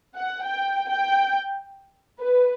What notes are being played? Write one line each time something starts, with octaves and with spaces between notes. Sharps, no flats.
F#5
G5
G5
B4